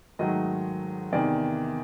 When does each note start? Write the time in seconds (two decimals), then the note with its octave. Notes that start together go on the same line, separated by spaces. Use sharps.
0.19 G#2 D#3 F#3 A3 D#5
1.12 E2 C3 D#3 D5